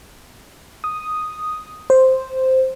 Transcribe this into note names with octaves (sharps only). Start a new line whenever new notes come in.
D#6
C5